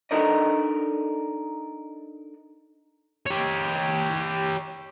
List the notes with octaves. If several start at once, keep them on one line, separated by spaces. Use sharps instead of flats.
D4 D#4 A4 A#4 D5 D#5
G4 C#5